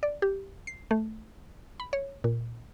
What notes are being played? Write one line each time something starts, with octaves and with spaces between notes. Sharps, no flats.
D5
G4
C7
A3
B5
C#5
A#2